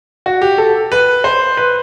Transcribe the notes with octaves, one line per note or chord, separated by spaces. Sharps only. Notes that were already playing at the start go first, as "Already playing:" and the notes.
F#4
G4
A4
B4
C5
B4